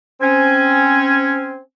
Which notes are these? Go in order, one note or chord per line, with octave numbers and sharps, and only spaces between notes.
C4 C#4 G#5